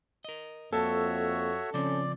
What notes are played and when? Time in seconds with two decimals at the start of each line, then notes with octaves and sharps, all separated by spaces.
0.25 A#4 D#5
0.73 F2 A#3 F#4 A4 C#5 E5
1.74 C#3 F3 C4 C#4 D5